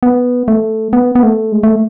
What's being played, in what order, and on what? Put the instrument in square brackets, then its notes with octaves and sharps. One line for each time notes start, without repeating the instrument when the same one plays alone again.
[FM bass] B3
A3
B3
B3
A3
G#3
A3